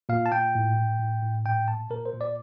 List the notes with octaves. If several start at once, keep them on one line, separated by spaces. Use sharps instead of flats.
A#2 F5
A5
A#2 G5
A2
A2
A2
A2
A#2 G5
A#2 A5
A#2 A#4
C5
A#2
D5